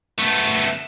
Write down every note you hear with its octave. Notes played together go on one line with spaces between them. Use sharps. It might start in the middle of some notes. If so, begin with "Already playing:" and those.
A3 B3